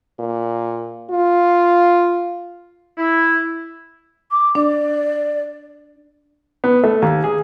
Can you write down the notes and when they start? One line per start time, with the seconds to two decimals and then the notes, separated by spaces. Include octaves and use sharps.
0.19 A#2
1.11 F4
2.97 E4
4.31 D6
4.55 D4 D5
6.64 B3
6.84 A3
7.02 D#2
7.24 G#4